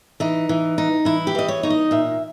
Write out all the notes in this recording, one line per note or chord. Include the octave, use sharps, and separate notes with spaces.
E3 D#4
E3
D#4
E3 E4
G4
E3 D#5
C#5
D#4 C#5
D#5
A#2 E5